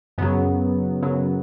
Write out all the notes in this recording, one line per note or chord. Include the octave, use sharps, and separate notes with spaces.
F#2 C#3 F#3 B3
F#2 C#3 F#3